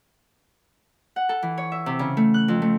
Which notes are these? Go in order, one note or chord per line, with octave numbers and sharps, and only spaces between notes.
F#5
A4
E3
C#5
E5
C3
C#3
A3
F#6
F2
A3